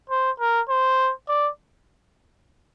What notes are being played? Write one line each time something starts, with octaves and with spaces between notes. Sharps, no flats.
C5
A#4
C5
D5